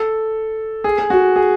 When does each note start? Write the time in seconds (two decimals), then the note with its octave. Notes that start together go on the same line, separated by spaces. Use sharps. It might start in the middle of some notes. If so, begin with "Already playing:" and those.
Already playing: A4
0.84 G#4
0.98 G#4
1.10 F#4
1.36 G#4